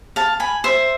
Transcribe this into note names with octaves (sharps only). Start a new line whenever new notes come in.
F5 A5
G#5 B5
C5 E5